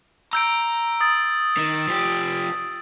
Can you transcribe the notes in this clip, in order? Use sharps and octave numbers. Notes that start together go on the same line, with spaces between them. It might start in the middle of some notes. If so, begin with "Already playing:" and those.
A#5 E6 G6 D7
D#6 A6
D#3
F3 G4